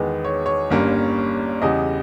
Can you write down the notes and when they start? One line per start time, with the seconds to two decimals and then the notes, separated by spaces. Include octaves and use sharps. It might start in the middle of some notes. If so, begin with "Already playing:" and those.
Already playing: E2 D#3 G#3 B3
0.24 C#5
0.46 C#5
0.70 G1 G2 G3 A#3 C#4
1.62 E2 C#3 G3 D#5